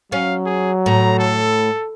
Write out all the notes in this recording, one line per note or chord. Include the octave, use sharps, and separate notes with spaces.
F#3 C#4 F5
G#4
A2 A#5
A4